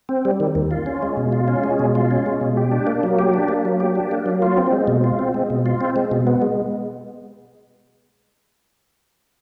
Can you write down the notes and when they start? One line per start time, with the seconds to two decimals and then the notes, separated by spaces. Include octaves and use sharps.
0.09 C4
0.25 G3
0.40 D#3
0.55 D#2
0.71 F4
0.86 C#4
1.03 G#3
1.17 B2
1.32 F4
1.48 C#4
1.64 G#3
1.79 B2
1.95 F4
2.11 C#4
2.26 G#3
2.41 B2
2.57 G4
2.71 D4
2.87 A#3
3.03 F#3
3.19 G4
3.34 D4
3.48 A#3
3.65 F#3
3.80 G4
3.95 D4
4.11 A#3
4.26 F#3
4.42 F4
4.58 C4
4.72 G#3
4.88 B2
5.04 F4
5.19 C4
5.34 G#3
5.50 B2
5.66 F4
5.81 C4
5.96 G#3
6.11 B2
6.27 B3
6.42 G#3